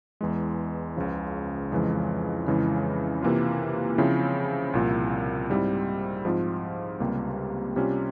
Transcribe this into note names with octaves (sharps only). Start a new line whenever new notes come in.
E2 E3 G#3
C#2 C#3 F3
F2 C#3 E3 G#3
F2 C#3 E3 G#3 E4
C3 E3 A#3 F4
C#3 F3 C4 E4
C2 A#2 F3
G#2 G3 C4 E4
G#2 F3 C4 F4
C#2 C3 G3 A#3
C3 G3 C#4 F4